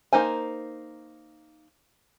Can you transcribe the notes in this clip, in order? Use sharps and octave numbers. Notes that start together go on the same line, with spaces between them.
A#3 D#4 C5 G#5